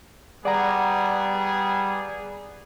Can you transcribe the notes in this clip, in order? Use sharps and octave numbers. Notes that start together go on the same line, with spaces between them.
G3 B3 G#4 D5 F#5 A#5